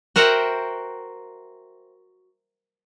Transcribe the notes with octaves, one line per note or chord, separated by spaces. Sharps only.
F#4 A#4 C5 E5 F#5 G5